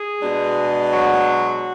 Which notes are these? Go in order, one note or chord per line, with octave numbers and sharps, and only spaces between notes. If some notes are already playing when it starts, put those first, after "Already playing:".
Already playing: G#4
B2 G#3 D4
F#3 F#4